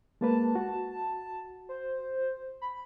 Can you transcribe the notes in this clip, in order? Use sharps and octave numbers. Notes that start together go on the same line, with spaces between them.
G#3 A#3 B4 A5
F#4
C5
B5